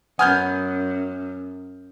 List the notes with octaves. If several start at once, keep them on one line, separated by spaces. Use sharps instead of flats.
F#2 F#3 B3 F#5 G#5 D#6 F6 G6